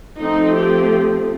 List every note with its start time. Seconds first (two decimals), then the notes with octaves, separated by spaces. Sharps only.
0.18 F3 A3 C4 D#4
0.54 G4